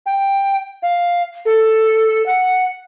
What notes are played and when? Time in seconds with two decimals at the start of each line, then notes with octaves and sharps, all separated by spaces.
0.06 G5
0.82 F5
1.45 A4
2.26 F#5